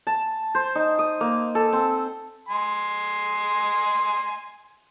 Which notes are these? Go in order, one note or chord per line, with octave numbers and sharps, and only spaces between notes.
A5
C5
D#4
D#6
A#3
A4
C4
G#5 C6